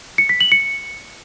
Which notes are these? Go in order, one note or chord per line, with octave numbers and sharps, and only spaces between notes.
C#7
B6
F#7
C#7